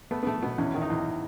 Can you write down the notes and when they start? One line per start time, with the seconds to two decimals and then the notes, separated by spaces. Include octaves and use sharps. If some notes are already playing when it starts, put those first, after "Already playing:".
0.11 A3 B3
0.23 B3
0.27 A3
0.43 B2 B3
0.58 E2 C#4
0.75 D#3
0.82 D#4
0.90 E2